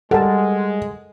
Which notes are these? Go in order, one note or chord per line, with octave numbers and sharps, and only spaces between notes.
G3 G#3 A4 A#4 F#5 A5